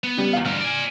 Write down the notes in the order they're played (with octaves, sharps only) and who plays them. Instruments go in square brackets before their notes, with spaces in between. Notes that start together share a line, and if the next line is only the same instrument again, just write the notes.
[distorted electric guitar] B3
[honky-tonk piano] C#3 G3
E2 F5
[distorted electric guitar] D2 G2 [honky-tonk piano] F6
[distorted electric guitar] D5 G#5